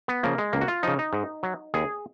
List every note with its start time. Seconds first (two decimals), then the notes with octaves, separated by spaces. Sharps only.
0.08 B3
0.23 C#3 F3 A#3
0.38 G#3
0.53 C#2 A#3
0.61 F#4
0.68 F4
0.83 C#3 F3 D#4
0.99 D#4
1.13 G#2
1.43 F#3
1.74 D#2 G#4